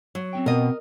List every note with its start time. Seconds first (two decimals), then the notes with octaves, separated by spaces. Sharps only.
0.15 F#3
0.33 C4 C#4 G5
0.46 B2 A#4 D#5